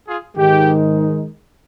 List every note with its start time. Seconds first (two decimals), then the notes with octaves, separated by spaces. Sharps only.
0.08 F4 G#4
0.37 G#2 D#3 G#3 D#4 G4